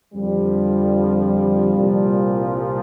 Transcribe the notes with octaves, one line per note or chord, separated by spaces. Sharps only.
F2 D3 F3 G3
C2 A#2 F3